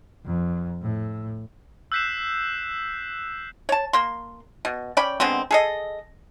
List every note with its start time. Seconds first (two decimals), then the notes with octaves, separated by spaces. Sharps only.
0.25 F2
0.82 A2
1.92 E6 F#6 G6 B6 C7 E7
3.69 C#5 A5
3.93 A#3 C6
4.65 B2
4.97 C#4 D5 G5 B5
5.20 D3 G#3 B3 C4
5.51 G#4 A4 D#5